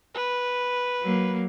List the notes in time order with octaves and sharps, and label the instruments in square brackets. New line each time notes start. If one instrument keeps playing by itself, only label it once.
[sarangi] B4
[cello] F#3 A#3